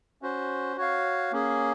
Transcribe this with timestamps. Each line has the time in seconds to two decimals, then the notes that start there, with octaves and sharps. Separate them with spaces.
0.22 C#4 F#4 C5
0.77 F#4 C#5 F5
1.32 A#3 C#4 G#4